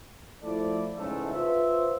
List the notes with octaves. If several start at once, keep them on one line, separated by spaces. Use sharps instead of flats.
F3 A3 E4 A4 D5
E2 G#2 C#3 G#3 A3 A4
F4 B4 C5 E5